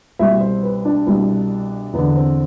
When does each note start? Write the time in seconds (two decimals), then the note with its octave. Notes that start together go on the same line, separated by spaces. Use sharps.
0.19 C2 B2 E5
0.41 C5
0.62 B4
0.85 D4
1.07 C2 B2
1.93 E2 D3 B3
2.16 C4